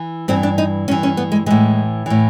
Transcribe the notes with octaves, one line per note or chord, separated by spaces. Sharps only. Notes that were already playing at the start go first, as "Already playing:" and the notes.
Already playing: E3
G2 E3 C4
D4
D#4
G2 E3 C#4
C#4
B3
G#3
A2 E3 G#3
A2 E3